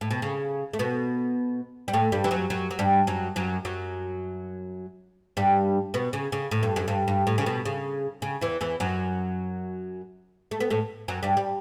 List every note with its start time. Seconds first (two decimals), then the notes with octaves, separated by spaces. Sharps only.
0.01 A2
0.11 B2
0.22 C#3
0.73 A3
0.79 B2 B3
1.88 G3
1.93 A2 A3
2.12 G2 G3
2.24 E3
2.31 F#2 F#3
2.50 F#2 F#3
2.71 F#3
2.79 G2 G3
3.07 F#2 F#3
3.36 F#2 F#3
3.65 F#2 F#3
5.37 G2 G3
5.94 B2 B3
6.13 C#3
6.32 C#3
6.51 A2
6.63 G2
6.76 F#2
6.88 G2
7.08 G2
7.27 A2
7.38 C#3
7.46 B2
7.65 C#3
8.22 C#3
8.41 E2 E3
8.61 E2 E3
8.80 F#2 F#3
10.51 A3
10.60 B3
10.70 A2 A3
11.08 F#2 F#3
11.23 G2 G3
11.37 G3